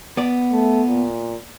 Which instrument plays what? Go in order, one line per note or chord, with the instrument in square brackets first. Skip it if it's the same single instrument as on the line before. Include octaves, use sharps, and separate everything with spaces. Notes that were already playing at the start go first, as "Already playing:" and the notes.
[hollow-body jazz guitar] B3 D5
[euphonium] A3
A#2